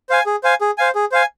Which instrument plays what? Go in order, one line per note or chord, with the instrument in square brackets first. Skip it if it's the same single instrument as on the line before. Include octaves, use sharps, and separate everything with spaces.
[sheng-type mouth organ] C5 F5 G#5
G#4
C5 F5 G#5
G#4
C5 F5 G#5
G#4
C5 F5 G#5